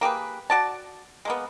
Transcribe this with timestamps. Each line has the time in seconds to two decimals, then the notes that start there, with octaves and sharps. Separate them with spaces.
0.01 A#3 G4 G#4 B4
0.50 F#4 D5 A5
1.25 G#3 A#3 B3